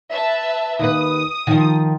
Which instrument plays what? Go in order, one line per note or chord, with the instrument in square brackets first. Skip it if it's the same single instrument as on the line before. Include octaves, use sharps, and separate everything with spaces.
[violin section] B4 E5 A5
[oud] D#2 B4 [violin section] D#6
[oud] D#3 F3